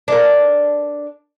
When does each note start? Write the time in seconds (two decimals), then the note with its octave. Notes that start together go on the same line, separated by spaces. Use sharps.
0.08 D4 A#4